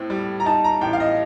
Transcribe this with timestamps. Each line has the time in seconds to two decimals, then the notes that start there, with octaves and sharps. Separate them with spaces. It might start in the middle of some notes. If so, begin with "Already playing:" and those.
Already playing: A2 C4
0.10 G3
0.40 A#5
0.45 D#4 A5
0.64 A#5
0.81 A1 G5
0.93 F5
1.00 D#5